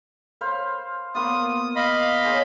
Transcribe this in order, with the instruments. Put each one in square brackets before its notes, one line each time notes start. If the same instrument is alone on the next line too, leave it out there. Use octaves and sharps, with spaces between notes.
[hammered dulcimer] C5 F5 B5
[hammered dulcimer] A#3 B3 F4 [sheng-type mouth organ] D#6
[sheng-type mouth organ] D#5 F5 B5
[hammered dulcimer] G#4 C5 C#5